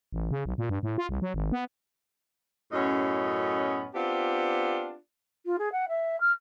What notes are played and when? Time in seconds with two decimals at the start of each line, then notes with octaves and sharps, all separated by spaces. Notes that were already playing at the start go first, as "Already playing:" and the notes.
0.12 A1
0.31 C#3
0.46 B1
0.58 A#2
0.69 G2
0.83 A2
0.98 F4
1.09 C2
1.22 F#3
1.34 G#1
1.52 B3
2.72 F#2 A2 B3 C#4 D#5
3.94 B3 C4 D4 F4 G4
5.45 F4
5.58 G#4
5.72 F#5
5.88 E5
6.20 F6